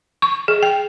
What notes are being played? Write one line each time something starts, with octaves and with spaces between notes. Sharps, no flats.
C#6
G#4
G5